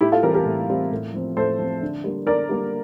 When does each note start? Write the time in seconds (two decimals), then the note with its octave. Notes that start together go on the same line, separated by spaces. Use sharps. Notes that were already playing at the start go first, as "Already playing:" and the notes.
0.01 A2 E4 G4
0.12 F4 A4
0.23 E3 G3 C4 G4 A#4
0.34 G4 A#4
0.46 A2
0.69 E3 G3 C4
0.91 A2
1.13 F3 C4
1.37 A2 A4 C5
1.59 F3
1.64 C4
1.82 D3
2.04 G3 A#3
2.27 D3 A#4 D5
2.49 G3 A#3